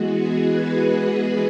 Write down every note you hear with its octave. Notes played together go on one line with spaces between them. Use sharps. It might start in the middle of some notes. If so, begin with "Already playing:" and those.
Already playing: E3 G#3 B3 F#4
G#4
B4